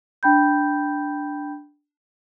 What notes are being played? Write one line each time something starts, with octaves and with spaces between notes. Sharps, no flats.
D4 G5 B5 G6